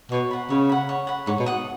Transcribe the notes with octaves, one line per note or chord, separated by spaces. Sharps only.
B2 C#5
F#5 B5
C#3 C#5
F#5 B5
C#5
F#5 B5
G#2 C#5
B2
F#5 D#6